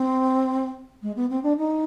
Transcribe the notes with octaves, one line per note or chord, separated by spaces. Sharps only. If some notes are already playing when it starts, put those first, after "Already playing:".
Already playing: C4
G#3
B3
C4
D4
D#4